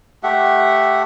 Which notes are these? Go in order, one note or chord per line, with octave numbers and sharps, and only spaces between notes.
A3 G4 E5 F#5